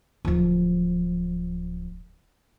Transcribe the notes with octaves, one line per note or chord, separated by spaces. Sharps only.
D1 F3